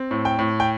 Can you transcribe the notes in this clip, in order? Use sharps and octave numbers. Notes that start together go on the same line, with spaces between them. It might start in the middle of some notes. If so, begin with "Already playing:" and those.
Already playing: C4
A2
G5
A2
G5